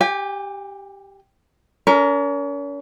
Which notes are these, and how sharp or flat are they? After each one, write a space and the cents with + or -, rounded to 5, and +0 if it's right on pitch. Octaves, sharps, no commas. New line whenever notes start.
G4 +0 G#5 -40
C#4 +40 A#4 +0